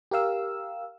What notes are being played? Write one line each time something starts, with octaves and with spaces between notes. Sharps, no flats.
G4 A#4 F5 E6